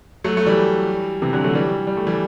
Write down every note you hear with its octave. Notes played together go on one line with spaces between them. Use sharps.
F#3 A3
A3
E3 G3
C3 E3
D3 F#3
F#3 A3
E3 G3
G3
A3
E3 G3